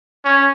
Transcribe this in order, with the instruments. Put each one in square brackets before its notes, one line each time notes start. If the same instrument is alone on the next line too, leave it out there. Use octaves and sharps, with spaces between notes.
[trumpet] C#4